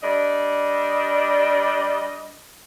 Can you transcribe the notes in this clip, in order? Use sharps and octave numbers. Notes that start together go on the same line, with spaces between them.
G3 D4 D#5